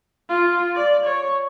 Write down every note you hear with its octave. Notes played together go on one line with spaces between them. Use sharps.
F4
D5
C#5